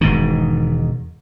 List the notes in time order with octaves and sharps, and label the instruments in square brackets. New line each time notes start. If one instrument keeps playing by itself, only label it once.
[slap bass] E1 G#2 D#3